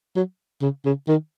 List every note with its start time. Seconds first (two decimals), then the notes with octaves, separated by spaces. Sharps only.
0.16 F#3
0.62 C#3
0.85 C#3
1.08 D#3